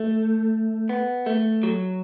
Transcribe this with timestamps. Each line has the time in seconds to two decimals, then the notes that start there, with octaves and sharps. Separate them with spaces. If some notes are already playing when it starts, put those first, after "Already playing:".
Already playing: A3
0.89 B3
1.26 A3
1.63 F#3